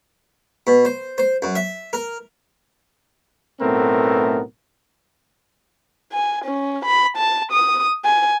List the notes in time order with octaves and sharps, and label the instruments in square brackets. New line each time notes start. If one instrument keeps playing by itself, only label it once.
[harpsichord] B2
C5
C5
F#2
E5
A#4
[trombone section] B1 A2 A3 B3 C4 A#4
[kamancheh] G#5
C#4
B5
A5
D#6
G#5